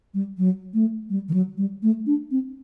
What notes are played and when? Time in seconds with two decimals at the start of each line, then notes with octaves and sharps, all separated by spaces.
0.14 G3
0.38 F#3
0.74 A3
1.10 G3
1.28 D#3
1.34 F#3
1.58 G3
1.83 A3
2.06 D4
2.31 C4